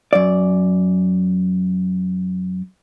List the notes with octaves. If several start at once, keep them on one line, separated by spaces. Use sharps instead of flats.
F#2 D5